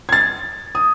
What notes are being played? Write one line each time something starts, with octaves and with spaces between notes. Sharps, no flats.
G#6 A6
D#6